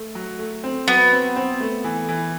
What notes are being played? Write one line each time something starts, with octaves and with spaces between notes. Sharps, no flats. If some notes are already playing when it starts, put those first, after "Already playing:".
Already playing: A3
F#3
A3
C4
F#3 B3
C4
C4
A3
E3
E3